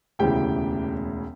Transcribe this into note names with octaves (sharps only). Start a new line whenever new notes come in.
E1 D2 C#3 E3 G4 G5